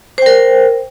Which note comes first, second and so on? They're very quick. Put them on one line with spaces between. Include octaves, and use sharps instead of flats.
C5 G5 A#4